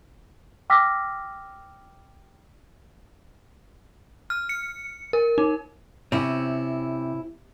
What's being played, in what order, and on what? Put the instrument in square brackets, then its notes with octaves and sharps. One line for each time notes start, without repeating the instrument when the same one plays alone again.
[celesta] G5 D6 E6 F6 A#6 B6
[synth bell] F6
C#7
A#4
D#4
[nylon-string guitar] C3 [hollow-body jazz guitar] C4 C#4 E4